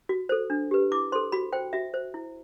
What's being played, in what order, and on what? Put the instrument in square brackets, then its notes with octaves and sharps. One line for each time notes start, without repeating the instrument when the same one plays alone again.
[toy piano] F#4
A4 C5
D4
G4 B4
E4 D6
A4 C5 C6
F#4 B5
C5 G5
F#4 E5
C5
E4